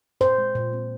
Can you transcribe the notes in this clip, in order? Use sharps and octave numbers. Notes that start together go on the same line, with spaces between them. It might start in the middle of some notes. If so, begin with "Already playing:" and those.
A#2 C5
G#3
A#2
C4